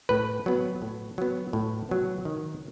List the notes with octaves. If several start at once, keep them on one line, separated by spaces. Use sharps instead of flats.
A2 B4
F#3 B3
A2
F#3 B3
A2
F#3 B3
D#3